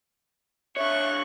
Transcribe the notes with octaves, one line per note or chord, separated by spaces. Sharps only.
D3 C#5 E5 C#6 F#6